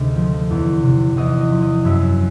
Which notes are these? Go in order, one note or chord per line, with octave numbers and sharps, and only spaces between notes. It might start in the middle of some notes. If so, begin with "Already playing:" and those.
Already playing: D2 C3 G#4 D#5
F3
E2
C3
E2 D#5
D#5
F3
D#5
F#2 E5